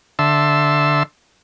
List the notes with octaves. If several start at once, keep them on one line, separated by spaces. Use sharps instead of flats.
D3 E5 A5 C6 E6